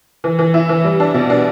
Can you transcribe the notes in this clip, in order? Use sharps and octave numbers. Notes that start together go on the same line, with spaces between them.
E3
E3
E4
E3
G3
D4
B2
D4